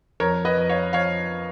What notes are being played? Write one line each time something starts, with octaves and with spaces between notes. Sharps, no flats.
F2 A#4 C#5
B4 D#5
F2
C#5 F5
F3 C#5 F5